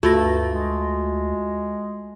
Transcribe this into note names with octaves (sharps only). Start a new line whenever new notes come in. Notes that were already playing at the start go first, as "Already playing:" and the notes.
D2 G2 A3 F4 F#4 A#6
G#3